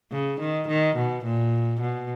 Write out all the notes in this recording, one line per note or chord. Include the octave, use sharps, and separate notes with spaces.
C#3
D#3
D#3
B2
A#2
B2